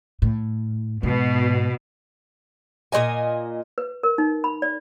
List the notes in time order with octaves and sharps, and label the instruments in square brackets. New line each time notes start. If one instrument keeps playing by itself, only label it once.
[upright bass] A2
[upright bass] G#2 [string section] B2
[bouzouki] A#2 C4 D#5 G#5
[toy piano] B4
A#4
D#4
B5
D5